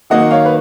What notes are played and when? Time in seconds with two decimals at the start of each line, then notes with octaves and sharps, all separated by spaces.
0.10 D#3 F#3 A#3 D#5 F#5
0.31 C#5 F5
0.45 B4